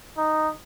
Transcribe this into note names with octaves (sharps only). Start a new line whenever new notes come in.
D#4